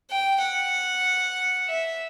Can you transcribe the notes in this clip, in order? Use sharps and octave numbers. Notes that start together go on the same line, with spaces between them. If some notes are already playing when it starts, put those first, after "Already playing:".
G5
F#5
E5